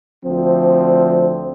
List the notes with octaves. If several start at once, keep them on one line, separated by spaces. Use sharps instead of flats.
D2 F3 C4